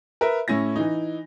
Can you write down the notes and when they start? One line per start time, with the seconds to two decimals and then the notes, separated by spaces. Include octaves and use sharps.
0.21 A#4 B4 E5
0.48 A2 C#4 E4 A#6
0.76 E3 D#4